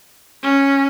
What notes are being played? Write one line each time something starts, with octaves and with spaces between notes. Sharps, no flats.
C#4